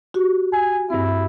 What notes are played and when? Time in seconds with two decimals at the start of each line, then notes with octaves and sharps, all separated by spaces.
0.14 F#4 G4
0.52 G#5
0.90 G2 C4 E4